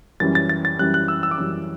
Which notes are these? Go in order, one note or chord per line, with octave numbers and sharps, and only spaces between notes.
F#2 E3 G3 C#4 A6
A6
A6
A6
F#2 E3 G3 C#4 F#6
F#6
E6
E6
D6
F#2 E3 G3 C#4 E6